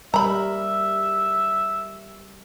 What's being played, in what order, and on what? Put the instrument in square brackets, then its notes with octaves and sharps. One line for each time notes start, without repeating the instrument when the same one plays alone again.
[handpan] G3 A#4 [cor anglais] E5 [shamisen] A#5 B5